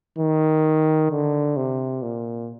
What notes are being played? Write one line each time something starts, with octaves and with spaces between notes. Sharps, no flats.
D#3
D3
C3
A#2